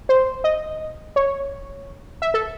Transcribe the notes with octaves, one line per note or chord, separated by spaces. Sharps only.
C5
D#5
C#5
E5
A4